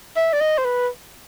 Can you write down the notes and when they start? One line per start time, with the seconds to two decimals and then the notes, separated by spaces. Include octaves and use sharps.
0.17 E5
0.33 D5
0.41 D#5
0.58 C5
0.65 B4